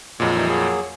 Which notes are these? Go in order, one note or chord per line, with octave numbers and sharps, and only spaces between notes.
F2 A#2 F#3 G#3
E3 G3 D#4
F#3 A#3 G#4